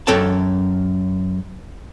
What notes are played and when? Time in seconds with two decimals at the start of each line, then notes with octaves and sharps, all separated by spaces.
0.07 F#2 A4 C#5 G5 A5